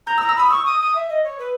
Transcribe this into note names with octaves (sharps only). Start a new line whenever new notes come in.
A#5 G6
E6
A#5
E6
B5 D#6
C#6 E6
D#6
D#6
E5
D#5
C#5
B4